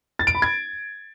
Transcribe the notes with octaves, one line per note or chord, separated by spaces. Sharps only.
A6
D7
B5
G#6